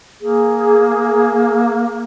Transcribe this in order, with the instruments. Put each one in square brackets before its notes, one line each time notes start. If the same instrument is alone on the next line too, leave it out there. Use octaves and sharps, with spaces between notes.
[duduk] A#3 [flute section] G#4